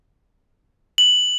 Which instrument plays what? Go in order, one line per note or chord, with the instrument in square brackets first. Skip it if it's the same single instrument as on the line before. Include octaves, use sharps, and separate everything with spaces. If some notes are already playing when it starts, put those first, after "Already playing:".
[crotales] F#7